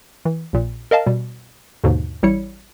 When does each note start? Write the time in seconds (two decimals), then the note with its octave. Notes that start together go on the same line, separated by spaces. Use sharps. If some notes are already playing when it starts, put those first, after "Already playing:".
0.25 E3
0.53 A#1 A#2
0.91 A#4 D#5 F5 A5
1.06 B2 G3
1.84 D#2 G#2 B2 D3
2.23 A1 G3 E4 C#5 C#7